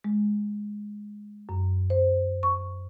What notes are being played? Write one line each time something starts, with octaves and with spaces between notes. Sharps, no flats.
G#3
F#2
C5
C#6